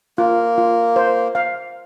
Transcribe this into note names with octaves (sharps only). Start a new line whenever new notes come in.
A#3 F4
F4
C5
F5